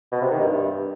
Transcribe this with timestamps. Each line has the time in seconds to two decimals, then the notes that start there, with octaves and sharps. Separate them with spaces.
0.12 B2
0.22 C3
0.31 D#3
0.41 G2